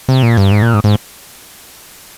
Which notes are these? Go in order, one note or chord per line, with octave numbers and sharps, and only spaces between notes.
C3
A#2
G2
G#2
A#2
G#2
G#2